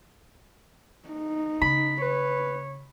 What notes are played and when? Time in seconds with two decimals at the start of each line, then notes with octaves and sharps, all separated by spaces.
1.09 D#4
1.61 C#3 B5
2.02 B4 C#5